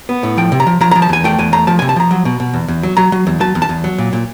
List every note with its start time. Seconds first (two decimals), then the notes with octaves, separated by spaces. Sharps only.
0.09 B3
0.23 A2
0.37 F3 G5
0.52 C3
0.60 A#5
0.67 F3
0.81 F3 A#5
0.91 F3 A#5
1.02 A5
1.09 E2 G#5
1.24 A3 G5
1.39 E2 G#5
1.53 A3 A#5
1.67 F3 A5
1.79 C3 G#5
1.89 A5
1.96 F3 A#5
2.11 F#3
2.25 B2
2.40 B2
2.54 E2
2.68 E2
2.83 F#3
2.97 F#3 A#5
3.12 F#3
3.27 E2
3.40 F#3 A5
3.55 E2
3.62 A5
3.69 E2
3.84 F#3
3.98 A#2
4.13 A#2